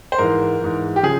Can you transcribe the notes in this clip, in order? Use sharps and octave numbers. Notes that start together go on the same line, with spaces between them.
C5
G#2 E3 A#4
G#2 E3
G4
C#3 F3 G#4